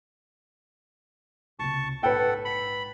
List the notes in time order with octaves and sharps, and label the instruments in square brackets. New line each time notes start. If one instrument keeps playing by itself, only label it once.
[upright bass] C#2 C3 [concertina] A5 C#6
[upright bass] A#1 G#2 [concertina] A4 F#5 [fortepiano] B4 G5
[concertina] B5